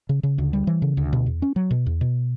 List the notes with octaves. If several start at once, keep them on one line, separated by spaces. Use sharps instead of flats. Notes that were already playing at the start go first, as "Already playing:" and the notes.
C#3
C#3
D2
G3
E3
C#3
D2
B2
E2
C#4
F#3
B2
E2
B2